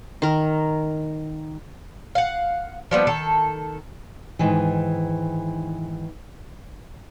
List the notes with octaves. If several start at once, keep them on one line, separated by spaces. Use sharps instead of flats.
D#3 A#4
F5 F#5
F3 G3 A#3 B3
D#3 A4
G#2 D#3 E3